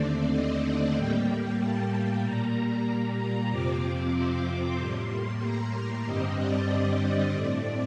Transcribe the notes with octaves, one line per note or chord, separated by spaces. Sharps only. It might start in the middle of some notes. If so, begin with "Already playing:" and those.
Already playing: D#2 D3 A3 C4 D5
D#5
A2 G3 A#3 G5
A5
A#2 G3 A#3 A#5
A#5
F2 C3 F3 C4 D6
C6
A2 G3 A#3
A#5
G2 D3 G3 C4 D#5
D5
A2 A3 C4